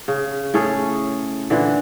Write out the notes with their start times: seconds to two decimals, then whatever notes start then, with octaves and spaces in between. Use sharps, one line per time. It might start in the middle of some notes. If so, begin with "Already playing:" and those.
0.08 C#3
0.54 A2 C#4 G#4 A4
1.50 A#2 D3 E3